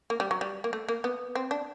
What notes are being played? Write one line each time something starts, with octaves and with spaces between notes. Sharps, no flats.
A#3
G3
F#3
G3
A#3
A3
A#3
B3
C4
D4